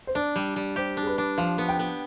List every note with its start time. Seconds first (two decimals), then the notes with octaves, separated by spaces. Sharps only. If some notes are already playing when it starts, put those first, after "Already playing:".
0.07 C5
0.15 D4 D5
0.36 G3
0.56 G3
0.76 G4 C5
0.97 D4
1.03 G#4
1.07 B4
1.18 D4
1.38 F3 F5
1.58 B3
1.69 G5
1.79 B3